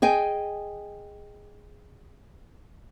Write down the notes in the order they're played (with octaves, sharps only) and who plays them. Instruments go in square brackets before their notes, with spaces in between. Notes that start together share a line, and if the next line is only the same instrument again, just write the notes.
[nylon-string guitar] G#4 D#5 G5 G#5